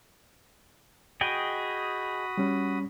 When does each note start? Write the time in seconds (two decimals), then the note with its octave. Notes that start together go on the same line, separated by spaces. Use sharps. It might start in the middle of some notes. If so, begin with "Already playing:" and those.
1.21 F#4 G#4 D#5 G5 B5 D#6
2.38 G3 C#4